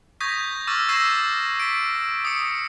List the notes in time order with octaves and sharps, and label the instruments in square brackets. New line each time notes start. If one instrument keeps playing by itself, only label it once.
[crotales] C#6 D#6 G6 G#6 A#6 B6
C#6 D6 E6 F6 A6
C#6 E6 G#6 A#6 C7 E7
B6 D7
D#6 C#7